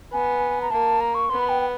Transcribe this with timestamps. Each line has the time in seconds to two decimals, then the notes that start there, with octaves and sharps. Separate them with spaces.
0.12 B3 G#5
0.62 A#5
0.71 A#3 A5
1.00 A#5
1.15 C#6
1.30 B3 C6
1.39 B5
1.49 G5
1.60 G5